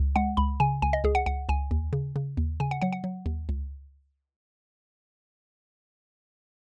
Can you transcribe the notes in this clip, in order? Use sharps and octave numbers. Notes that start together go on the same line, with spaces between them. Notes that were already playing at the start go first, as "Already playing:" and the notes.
Already playing: C#2
G#3 F#5
C#2 B5
C#3 G#5
C#2 G#5
D#5
C#2 G#4
F#5
C#2 F#5
C#2 G#5
D#2
C#3
C#3
D#2
C#3 G#5
F#5
F#3 F#5
F#5
F#3
D#2
C#2